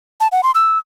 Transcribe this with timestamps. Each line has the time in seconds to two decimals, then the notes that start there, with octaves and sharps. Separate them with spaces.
0.20 A5
0.32 F#5
0.43 C6
0.55 E6